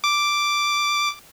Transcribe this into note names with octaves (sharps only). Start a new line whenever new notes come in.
D6